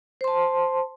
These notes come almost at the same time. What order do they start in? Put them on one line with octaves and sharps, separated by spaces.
C5 C6 A5